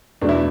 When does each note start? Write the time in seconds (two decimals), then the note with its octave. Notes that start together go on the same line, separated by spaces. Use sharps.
0.22 E2 B2 A3 D4
0.29 E4